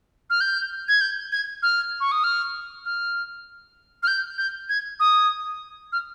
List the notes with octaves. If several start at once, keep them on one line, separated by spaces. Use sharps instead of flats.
F6
G6
G#6
G6
G#6
F6
C#6
D#6
F6
F6
F6
G6
G6
G#6
D#6
F6